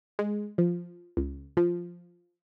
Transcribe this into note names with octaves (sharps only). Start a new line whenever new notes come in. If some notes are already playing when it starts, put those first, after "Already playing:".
G#3
F3
C#2
F3